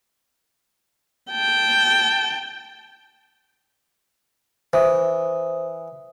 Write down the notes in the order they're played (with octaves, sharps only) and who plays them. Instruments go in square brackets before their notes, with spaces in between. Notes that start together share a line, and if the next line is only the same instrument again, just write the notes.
[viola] G5 A5
[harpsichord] E3 [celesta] C5 D#6